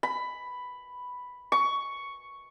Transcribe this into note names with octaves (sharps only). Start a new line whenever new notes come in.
B5
C#6